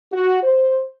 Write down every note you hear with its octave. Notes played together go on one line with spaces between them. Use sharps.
F#4
C5